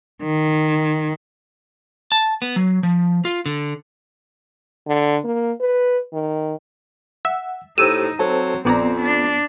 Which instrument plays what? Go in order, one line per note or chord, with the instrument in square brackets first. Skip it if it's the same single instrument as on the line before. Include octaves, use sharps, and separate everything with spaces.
[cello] D#3
[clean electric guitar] A5
B3
F#3
F3
F4
D3
[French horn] D3
A#3
B4
D#3
[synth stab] E5 [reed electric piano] F#5
[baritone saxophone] A2 [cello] D#4 [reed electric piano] G4 C5 [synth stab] E6 D#7
[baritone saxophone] F#3 [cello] C4 [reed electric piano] A4 C5 A5
[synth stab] A#1 D5 A#5 [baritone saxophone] F2 [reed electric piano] B3 [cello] C4
[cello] D4